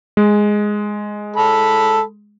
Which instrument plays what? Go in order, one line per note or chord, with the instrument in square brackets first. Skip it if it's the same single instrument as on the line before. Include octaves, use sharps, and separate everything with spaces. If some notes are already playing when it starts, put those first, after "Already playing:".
[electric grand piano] G#3
[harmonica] A4 B5